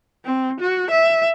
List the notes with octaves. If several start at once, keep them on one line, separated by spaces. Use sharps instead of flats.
C4
F#4
E5